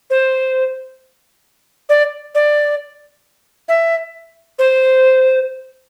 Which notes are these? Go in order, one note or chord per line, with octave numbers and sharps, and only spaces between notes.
C5
D5
D5
E5
C5